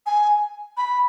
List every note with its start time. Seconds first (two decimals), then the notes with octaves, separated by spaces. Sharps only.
0.06 G#5
0.77 B5